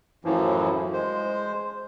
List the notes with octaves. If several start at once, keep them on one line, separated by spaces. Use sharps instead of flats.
F#2 A2 E3 F3
G#3 C5